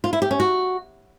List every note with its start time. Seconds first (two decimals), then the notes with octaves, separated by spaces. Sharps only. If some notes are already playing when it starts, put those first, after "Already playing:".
0.04 F4
0.13 E4
0.22 G4
0.31 C#4
0.40 F#4